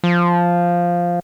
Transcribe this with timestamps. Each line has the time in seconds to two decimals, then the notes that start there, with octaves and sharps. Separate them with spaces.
0.04 F3